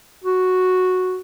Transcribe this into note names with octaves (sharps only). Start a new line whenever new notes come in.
F#4